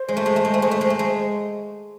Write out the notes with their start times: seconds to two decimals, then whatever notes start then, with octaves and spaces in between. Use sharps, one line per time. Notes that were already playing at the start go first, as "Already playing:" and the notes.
Already playing: C5
0.08 G#3
0.17 A3
0.26 G#3
0.36 A3
0.45 G#3
0.54 A3
0.62 G#3
0.71 A3
0.81 G#3
0.90 A3
0.99 G#3